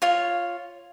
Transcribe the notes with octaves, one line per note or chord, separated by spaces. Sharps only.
F4 C#5